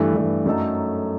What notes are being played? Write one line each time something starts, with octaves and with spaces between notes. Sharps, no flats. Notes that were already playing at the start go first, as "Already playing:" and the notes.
Already playing: G2 E3 A3
G2 E3 A3
F#2 F#3 A3 D#4 A4